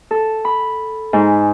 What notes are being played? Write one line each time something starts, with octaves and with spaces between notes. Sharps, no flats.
A4
B5
G#2